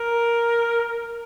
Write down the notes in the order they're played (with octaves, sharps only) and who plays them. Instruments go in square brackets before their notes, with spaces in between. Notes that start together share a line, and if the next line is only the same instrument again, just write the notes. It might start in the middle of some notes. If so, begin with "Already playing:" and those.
Already playing: [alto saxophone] A#4